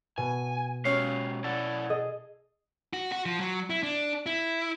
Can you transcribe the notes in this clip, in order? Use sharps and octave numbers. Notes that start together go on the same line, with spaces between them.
B2 G#5
G#3 C#4 F#4 G4 F5 C#7
E4 A4 D5 F#5
G#4 D#5
F#4
F#4
F3
F#3
E4
D4
E4